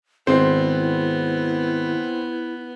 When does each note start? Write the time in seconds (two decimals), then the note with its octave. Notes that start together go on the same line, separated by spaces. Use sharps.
0.27 G#1 B3 C4 E4 C5